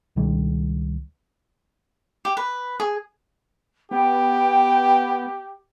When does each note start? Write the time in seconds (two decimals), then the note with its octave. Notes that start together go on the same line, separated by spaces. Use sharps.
0.16 C#2 B2 D#3 G3
2.25 G4
2.37 B4
2.80 G#4
3.91 B3 G4 G5